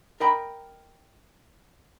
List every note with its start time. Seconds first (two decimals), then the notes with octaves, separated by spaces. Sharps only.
0.20 A#4 D#5 G5 A#5 B5